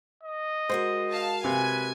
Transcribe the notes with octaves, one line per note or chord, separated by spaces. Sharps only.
D#5
G#3 F#4 A#4 C5
F5 A5
C3 B4 G#5